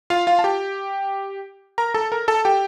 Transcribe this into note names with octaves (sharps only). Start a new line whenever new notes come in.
F4 F5
F4 F5
A5
G4 G5
A#4 A#5
A4 A5
A#4 A#5
A4 A5
G4 G5